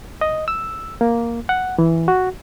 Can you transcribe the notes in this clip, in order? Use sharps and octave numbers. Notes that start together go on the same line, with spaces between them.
D#5
E6
A#3
F#5
E3
F#4